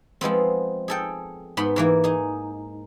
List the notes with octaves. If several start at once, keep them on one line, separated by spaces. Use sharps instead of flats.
F3 G#3 B3 C4
G#4 A4 G5
G#2 B3 B5 C6
G#2 E3 A#3
D#4 G#4